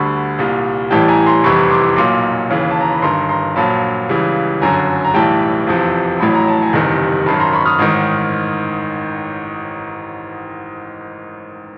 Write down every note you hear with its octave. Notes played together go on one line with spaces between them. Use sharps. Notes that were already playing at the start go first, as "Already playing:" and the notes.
Already playing: D2 D3 G3 B5 C#6
C2 A#2 G3
A1 A2 E3 G3 G5 A5
G#5 A#5
A#5 C6
F1 E2 C3 E3 G3 B5 C#6
C6 D6
B1 A#2 F#3 C6 D6
D#2 C#3 E3
A5
A#5
B5
G1 G2 D#3 A#5 C6
A#5 C6
A#1 A#2 F#3 A5 B5
C#2 C#3 E3 G3
G1 F#2 D3 G#5 A#5
A#5
B1 A2 E3 G3 G5 A5
F1 E2 C3 F3
A1 A2 F#3 B5
A#5
A5
G#5 A#5
F#1 E2 C3 D#3 G3
G#1 F#2 D#3 A5 B5
A#5 C6
B5 C#6
D#6 F6
A1 G#2 D#3